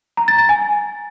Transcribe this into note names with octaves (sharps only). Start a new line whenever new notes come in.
A#5
A6
A6
G#5